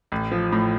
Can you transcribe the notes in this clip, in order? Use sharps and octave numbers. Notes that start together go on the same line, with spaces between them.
A1
F3
A2